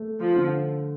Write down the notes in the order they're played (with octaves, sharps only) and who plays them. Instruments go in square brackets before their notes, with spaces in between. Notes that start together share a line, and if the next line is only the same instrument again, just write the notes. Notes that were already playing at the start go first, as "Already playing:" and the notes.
Already playing: [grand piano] A3
[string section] F3
[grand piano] D3